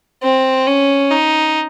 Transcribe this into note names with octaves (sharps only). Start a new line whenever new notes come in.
C4
C#4
D#4